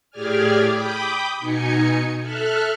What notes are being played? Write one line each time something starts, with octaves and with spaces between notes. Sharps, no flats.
A2 G4 G#4 D5 G#5 F6
G5 B5 D6 D#6 G6
B2 D#4 G#5 C#7
A4 E5 F6 F#6